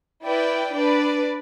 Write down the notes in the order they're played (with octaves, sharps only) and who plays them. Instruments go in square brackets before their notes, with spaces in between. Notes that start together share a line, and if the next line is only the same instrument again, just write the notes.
[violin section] E4 B4 D5 G5
D4 B4 D5